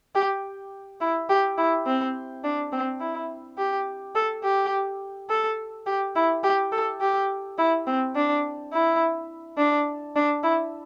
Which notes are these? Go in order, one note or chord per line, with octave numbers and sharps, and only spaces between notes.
G4
E4
G4
E4
C4
D4
C4
E4
G4
A4
G4
A4
G4
E4
G4
A4
G4
E4
C4
D4
E4
D4
D4
E4